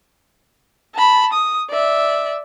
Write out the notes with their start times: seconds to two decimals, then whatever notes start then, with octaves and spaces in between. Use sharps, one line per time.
0.95 A5 B5
1.33 D#6
1.70 D5 E5